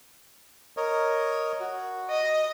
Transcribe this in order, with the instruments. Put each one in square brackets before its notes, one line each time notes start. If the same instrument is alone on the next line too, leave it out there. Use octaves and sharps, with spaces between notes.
[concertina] A#4 C#5 D#5
F#4
[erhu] D#5